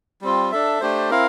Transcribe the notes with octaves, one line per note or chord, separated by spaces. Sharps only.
G3 C4 F4
D4 A4 E5
A3 D4 G4 C5
C4 E4 A#4 F5